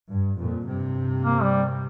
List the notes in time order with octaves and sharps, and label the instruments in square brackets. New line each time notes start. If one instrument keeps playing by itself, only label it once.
[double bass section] G2
F2 A#2
G2 C3
[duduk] A#3
G3